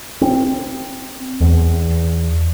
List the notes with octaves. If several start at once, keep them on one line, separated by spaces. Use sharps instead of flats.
C4
E2